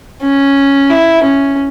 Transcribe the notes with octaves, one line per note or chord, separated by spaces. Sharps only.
C#4
E4
C#4